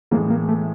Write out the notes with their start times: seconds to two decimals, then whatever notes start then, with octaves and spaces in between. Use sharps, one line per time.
0.11 A2 E3 G#3 A#3
0.30 A#3
0.49 A3